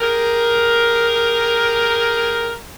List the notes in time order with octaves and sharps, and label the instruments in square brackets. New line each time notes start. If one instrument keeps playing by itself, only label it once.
[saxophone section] G4 G#4 A#4